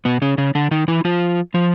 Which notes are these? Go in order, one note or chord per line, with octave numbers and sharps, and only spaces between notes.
B2 B3
C#3 C#4
C#3 C#4
D3 D4
D#3 D#4
E3 E4
F3 F4
F3 F4